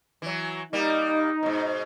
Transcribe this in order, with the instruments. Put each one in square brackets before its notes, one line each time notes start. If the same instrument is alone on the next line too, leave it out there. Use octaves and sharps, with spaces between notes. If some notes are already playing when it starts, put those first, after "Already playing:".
[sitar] E3 F#3
[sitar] G3 A#3 [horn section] D#4
[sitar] G#2 B2